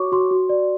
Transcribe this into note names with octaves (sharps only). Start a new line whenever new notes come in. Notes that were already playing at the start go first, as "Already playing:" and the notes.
Already playing: F#4 C#5 C#6 D6
F#4 C6
F#4
D5